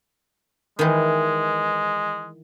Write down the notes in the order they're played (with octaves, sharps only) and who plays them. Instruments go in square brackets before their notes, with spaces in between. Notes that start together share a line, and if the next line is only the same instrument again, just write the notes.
[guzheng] D#3 E3 [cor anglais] G#3